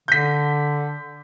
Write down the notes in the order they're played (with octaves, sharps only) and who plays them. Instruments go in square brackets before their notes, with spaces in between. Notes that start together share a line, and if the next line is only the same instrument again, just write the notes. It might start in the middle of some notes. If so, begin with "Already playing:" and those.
[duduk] D3 [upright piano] G6 B6